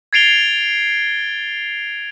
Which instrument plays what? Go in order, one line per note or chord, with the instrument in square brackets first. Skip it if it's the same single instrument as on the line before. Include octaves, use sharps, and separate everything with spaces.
[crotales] G#6 A6 C7 D7 F7 G7